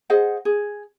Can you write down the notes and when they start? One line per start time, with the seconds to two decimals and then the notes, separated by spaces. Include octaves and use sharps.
0.10 G#4 C5 D#5 F#5
0.45 G#4